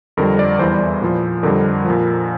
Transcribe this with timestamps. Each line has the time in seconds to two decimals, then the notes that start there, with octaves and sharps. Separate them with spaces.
0.17 F2 D3 G3 A#4
0.39 D5
0.59 E2 E3 G3 C5
1.02 A#2 F3
1.43 F2 D3 G3 A#4
1.85 F3
1.90 A#2